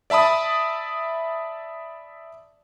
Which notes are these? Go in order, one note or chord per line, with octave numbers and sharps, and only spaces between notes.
D5 E5 A5 B5 D#6